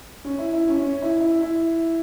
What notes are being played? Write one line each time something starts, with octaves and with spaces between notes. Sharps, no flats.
C#4
E4
E4
C#4
C#4
E4
E4
E4